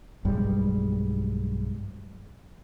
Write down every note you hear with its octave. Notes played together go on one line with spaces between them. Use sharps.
B1 G2 G3 G#3